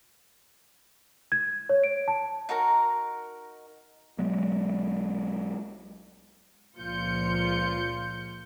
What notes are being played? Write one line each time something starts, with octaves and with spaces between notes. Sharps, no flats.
G#6
C#5
D7
A5
D#4 F#4 A#4 A#5
B1 F#3 G#3 B3
C#2 A#2 F3 F4 G6 C#7